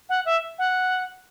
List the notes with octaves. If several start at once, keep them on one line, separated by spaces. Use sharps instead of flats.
F#5
E5
F#5